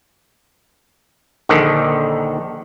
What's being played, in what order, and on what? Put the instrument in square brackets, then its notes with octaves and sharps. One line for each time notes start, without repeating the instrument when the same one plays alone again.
[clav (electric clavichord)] A#1 D3 D#3